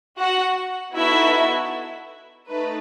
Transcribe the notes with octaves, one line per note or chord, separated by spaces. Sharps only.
F#4 F#5
B3 D#4 E4 F#4 A4 E5
A3 D#4 B4